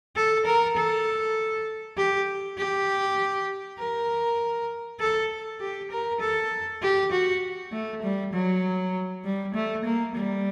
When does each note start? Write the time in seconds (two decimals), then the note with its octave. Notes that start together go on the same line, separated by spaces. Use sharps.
0.16 A4
0.46 A#4
0.77 A4
1.97 G4
2.58 G4
3.79 A#4
5.00 A4
5.61 G4
5.91 A#4
6.21 A4
6.82 G4
7.12 F#4
7.72 A3
8.03 G3
8.33 F#3
9.24 G3
9.55 A3
9.85 A#3
10.15 G3